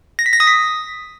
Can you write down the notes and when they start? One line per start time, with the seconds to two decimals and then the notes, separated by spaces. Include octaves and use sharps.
0.19 A#6
0.26 B6
0.33 A#6
0.40 D#6
0.47 B6